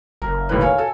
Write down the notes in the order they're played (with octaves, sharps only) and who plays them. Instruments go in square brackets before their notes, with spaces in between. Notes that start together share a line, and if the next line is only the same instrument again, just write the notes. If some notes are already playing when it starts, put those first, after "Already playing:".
[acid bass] F#1 [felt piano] A#4
[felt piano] D#2 A2 B4
C#5 F5 G#5
A4 G#5